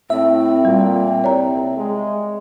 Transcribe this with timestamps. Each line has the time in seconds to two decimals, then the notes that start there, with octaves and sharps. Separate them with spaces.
0.10 A2 C4 E5
0.65 A#2 G3
1.24 C2 C#5 D5 A#5
1.78 G#3